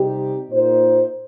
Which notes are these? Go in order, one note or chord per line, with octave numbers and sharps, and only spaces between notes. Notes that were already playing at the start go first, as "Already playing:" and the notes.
Already playing: C3 G3 C4 D#4 G4
A#2 A#3 D#4 C5